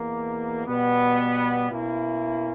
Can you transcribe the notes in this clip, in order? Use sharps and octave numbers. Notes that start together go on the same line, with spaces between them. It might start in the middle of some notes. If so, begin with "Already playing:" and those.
Already playing: E2 B2 A#3
B2 G3 B3
B2 A#3 C#4 E4